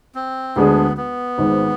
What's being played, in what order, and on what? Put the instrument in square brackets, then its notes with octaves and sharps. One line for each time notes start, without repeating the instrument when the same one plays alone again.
[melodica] C4
[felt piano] D2 D3 G#3 D4 G#4 [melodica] B3
[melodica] B3
[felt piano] G#1 G#2 G#3